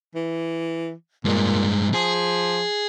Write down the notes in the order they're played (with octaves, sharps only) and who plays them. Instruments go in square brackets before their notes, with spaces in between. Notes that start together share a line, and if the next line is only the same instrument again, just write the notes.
[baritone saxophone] E3
[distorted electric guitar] G2 G#3 [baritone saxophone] A#2
[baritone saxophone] F3 [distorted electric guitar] G#4